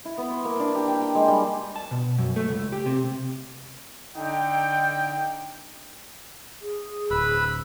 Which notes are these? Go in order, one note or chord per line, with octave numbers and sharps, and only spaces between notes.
E4
B3
C6
A#3
D4
G4
G5
G5
G#3
G3
A5
B2
F#2
A3
C#2
G4
C3
D3 D#4 G5
G#4
D1 B4 B5 E6